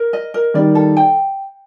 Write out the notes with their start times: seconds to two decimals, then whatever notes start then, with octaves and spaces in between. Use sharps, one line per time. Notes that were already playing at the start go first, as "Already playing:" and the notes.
Already playing: A#4
0.13 D#5
0.34 A#4
0.54 D#3 G3 D5
0.75 A4
0.97 G5